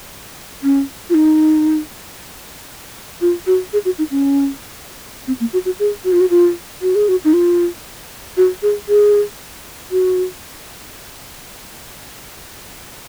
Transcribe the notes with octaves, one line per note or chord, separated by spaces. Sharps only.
C#4
F4
D#4
F4
F#4
G#4
F#4
D#4
C#4
C4
A#3
F#4
F#4
G#4
F#4
F4
F#4
F4
F#4
G#4
F#4
D#4
F4
F#4
G#4
G#4
F#4